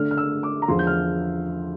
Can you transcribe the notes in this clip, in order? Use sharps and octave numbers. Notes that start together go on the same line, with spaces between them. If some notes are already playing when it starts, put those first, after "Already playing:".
Already playing: D3 A3 D4 F6
F6
E6
D6
A#5
E2 D3 F3 C6
G6
F6